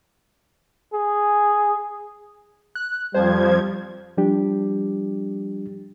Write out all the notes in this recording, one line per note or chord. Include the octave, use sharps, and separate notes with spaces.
G#4
F#6
F2 F3 G3 C5 G#6
F3 G3 D4 G4